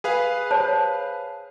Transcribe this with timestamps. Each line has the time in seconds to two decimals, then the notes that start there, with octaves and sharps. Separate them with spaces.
0.04 G#4 B4 F5
0.51 C5 C#5 A5